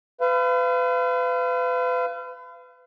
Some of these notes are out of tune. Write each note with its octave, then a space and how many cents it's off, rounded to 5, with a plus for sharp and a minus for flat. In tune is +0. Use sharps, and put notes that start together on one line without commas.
B4 +35 F5 -30